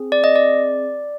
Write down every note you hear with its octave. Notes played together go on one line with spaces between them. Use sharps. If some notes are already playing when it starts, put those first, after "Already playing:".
Already playing: C4 G#4
D5
D#5
D5